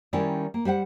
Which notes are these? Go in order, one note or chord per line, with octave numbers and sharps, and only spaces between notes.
D#3 G3 C#4 E4 A#4 D5
A#3
G3 C5 F5 F#5